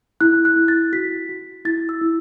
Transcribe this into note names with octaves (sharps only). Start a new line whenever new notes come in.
E4 F#6
F#6
E4
A6
F#4 B6
F#4
E4 A6
E6
E4